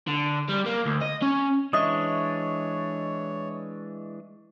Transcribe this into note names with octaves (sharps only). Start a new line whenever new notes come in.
D3
G3
A#3
D2
D#5
C#4
E3 G#3 D4 C#5 D#5 E5 C#6 D#6